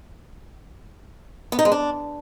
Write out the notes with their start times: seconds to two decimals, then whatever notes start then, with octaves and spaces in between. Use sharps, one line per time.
1.52 B3
1.59 D#4
1.65 G#3
1.72 D4